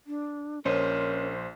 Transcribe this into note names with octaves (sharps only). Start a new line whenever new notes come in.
D4
A#1 C#4 A#4 C5 C#5 D#5 C6